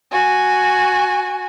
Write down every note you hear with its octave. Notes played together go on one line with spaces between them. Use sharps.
F#4 G#5